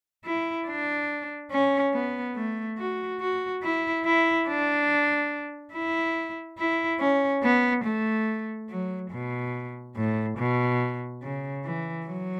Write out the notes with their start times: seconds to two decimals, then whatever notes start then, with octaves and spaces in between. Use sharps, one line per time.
0.25 E4
0.68 D4
1.52 C#4
1.94 B3
2.35 A3
2.78 F#4
3.20 F#4
3.63 E4
4.05 E4
4.48 D4
5.74 E4
6.58 E4
7.00 C#4
7.43 B3
7.84 A3
8.70 F#3
9.11 B2
9.96 A2
10.38 B2
11.23 C#3
11.64 E3
12.06 F#3